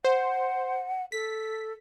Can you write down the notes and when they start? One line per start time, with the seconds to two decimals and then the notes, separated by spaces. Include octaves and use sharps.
0.04 C5 F#5
1.12 A4 B6